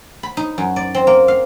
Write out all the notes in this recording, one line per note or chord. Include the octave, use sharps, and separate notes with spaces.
B5
D#4
F#2
D5
C4
A#3
F5